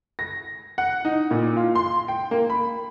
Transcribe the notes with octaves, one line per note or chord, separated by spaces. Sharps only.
A#6
F#5
D#4
A#2
F4
C6
G5
A#3
B5